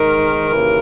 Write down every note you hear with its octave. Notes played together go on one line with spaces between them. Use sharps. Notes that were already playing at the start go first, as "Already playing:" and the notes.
Already playing: G#2 D#3 A#4
D#2 C#3 E3